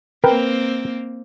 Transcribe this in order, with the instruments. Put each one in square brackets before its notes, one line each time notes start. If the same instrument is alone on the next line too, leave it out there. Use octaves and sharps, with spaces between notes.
[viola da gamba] A#3 C4 [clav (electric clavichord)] A#4 B4 G5